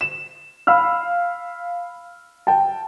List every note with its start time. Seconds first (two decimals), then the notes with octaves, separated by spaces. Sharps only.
0.01 E7
0.67 F5 B5 E6 F6
2.47 G5 A5